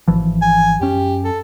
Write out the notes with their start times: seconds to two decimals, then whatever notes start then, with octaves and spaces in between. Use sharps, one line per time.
0.08 G#1 E3 F3
0.42 G#5
0.81 F#2 C#4 G4
1.25 A4